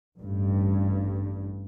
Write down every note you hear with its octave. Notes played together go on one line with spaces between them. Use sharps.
A1 G2